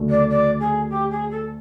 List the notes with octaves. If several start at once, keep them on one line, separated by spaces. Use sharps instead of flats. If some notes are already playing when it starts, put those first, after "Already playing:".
Already playing: D2 C#3 F#3 A3 D4
D5
D5
G#4
G4
G#4
A4